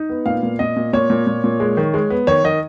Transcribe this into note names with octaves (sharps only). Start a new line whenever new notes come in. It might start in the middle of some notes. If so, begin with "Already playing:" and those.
Already playing: D#4
B3
A#2 F5
A#2
A#2 D#5
A#2
A#2 C#5
A#2
A#2
A#2
G#3
D#3
G#3
B3
D#3 C#5
D#3 D#5